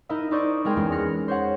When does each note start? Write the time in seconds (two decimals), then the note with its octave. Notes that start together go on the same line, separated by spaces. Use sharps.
0.09 D#4 E4 A#4 D#5
0.31 D#4 E4 C5 D5 C#6 D#6
0.65 G#3 C4 G#4 A#4 G5
0.77 E2 G#3 C4 C#4
0.92 F6 F#6 A#6 C#7
1.28 C5 C#5 F#5